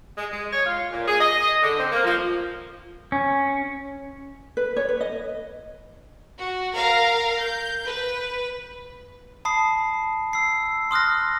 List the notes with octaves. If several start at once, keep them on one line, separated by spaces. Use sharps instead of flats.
G#3
G#3
C#5
F4
A#2
G#4
D#5
D3
C4
A#3
F3
C#4
B4
C#5
B4
D#5
F#4
A#4 F5 A#5
G6
B4
A5 B5 D#6 C7
E6 C7
C6 D#6 F6 F#6 A#6